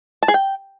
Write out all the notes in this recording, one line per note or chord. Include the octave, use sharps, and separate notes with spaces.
A5
G#4
G5